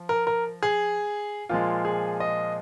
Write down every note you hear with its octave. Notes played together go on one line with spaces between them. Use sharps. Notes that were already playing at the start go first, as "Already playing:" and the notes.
Already playing: F3
A#4
A#4
G#4
A#2 F3 G#3 F4
G#4
D#5